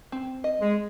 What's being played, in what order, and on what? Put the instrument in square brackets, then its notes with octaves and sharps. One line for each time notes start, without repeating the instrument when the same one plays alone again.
[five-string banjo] C4
D#5
[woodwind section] G#3